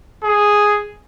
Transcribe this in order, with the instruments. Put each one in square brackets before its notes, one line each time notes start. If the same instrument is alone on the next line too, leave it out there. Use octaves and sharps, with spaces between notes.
[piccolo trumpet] G#4